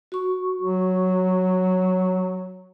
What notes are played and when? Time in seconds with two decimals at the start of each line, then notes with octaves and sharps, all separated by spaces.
0.12 F#4 C#6
0.61 F#3